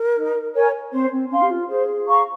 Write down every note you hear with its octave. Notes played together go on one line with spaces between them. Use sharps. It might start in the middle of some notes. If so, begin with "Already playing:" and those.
Already playing: A#4
D#4
A#4 C#5 G#5
C4 C5
C4
C#4 F5 C6
G4
F4
G#4 C5
F5 A#5 C#6